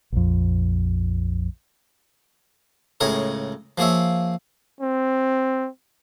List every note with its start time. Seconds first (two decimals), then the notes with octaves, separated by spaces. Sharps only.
0.12 A#1 F2
3.00 C#2 A2 G#4 A#4 C#5
3.78 F3 A#3 G#4 C#5 E5
4.81 C4